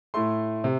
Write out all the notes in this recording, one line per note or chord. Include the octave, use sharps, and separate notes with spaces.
A2 A3 C6
C3